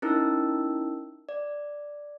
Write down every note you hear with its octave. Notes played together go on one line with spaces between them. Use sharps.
C#4 D#4 E4 A#4 E6
D5